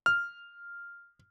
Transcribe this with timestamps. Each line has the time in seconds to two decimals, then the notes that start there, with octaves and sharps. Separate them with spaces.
0.06 F6